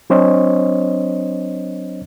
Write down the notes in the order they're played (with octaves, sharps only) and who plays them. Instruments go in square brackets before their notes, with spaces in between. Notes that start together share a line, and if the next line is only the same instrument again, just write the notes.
[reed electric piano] F#3 C4 D4 C5 C#5 D#5